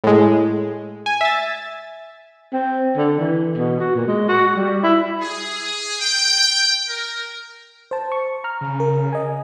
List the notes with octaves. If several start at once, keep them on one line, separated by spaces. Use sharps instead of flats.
A2 G#3
G#5
E5 A6
C4
D3
E3
B2
F#4
A#2
G#3
F#4
G3
E4
G#4
G5
A#4
C5 A5
C#6
A#5 F6
C#3
A#4
D#5 G#5